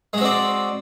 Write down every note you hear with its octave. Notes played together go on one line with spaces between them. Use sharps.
G#3 C4 F#4 D5